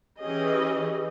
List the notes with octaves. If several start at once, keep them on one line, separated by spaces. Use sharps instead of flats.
E3 C#4 G4 G#4 D#5